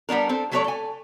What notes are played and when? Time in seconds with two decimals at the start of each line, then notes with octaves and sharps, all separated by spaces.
0.09 G3 B3 D4 A#4
0.29 C4 A4
0.52 F#3 A3 A4 A#4 C#5 D5
0.64 A4 G#5